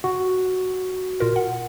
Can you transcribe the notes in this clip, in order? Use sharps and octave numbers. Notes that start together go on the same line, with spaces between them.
F#4
A#2 F4 A#4
F#5